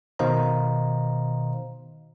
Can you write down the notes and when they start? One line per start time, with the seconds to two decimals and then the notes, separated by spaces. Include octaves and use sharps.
0.19 B2 D#3 C5 D#5 F5 A#5